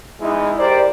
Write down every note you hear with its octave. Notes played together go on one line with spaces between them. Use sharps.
E2 G#3 D#4 E4
G4 A#4 C5 D5